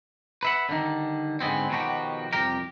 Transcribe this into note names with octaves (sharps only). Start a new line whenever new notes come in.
B4 E5 F#5
D3 D#3 G3 D#4
G#2 D3 G#3 B3 C4
B2 D#3 F3 C#4 F#4 G4
C2 F2 G4 A#4